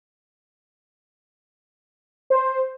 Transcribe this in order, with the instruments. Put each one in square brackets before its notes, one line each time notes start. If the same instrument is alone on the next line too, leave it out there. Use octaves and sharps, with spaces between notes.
[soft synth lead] C5